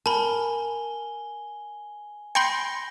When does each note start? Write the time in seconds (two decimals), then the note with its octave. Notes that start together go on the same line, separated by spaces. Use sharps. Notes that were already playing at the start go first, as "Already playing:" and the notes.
0.06 A#4 G#5 A5 B5 G7
2.35 G5 B5 C6 G6 A#6 C#7